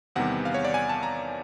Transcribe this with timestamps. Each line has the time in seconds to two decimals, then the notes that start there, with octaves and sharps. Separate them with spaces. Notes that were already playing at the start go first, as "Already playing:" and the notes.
0.16 E2 C3 D#3 G3 B3 F#5
0.45 F5
0.54 C#5
0.65 D5
0.74 G#5
0.89 A5
1.03 A#5